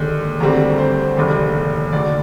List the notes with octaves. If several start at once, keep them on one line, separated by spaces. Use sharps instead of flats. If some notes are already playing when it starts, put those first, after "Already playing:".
Already playing: D#2 D3 G#3
D2 D3 G3 C4 A#5
C5
F1 D#2 D3 G#3
D2 D3 G#3 D5